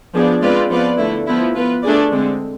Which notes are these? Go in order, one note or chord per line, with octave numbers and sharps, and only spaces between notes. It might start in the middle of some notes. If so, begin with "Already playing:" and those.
F3 B3 D4 G#4 D5
G#3 C4 F4 B4 D5
F3 B3 F4 B4 D5
D3 A3 E4
F3 B3 E4
B3 F4 B4
A3 D4 G#4 D5
D3 G#3 C4